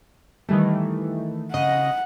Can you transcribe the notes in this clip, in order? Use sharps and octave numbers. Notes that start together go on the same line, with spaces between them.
D#3 E3 G3 A3
C#3 D#5 F#5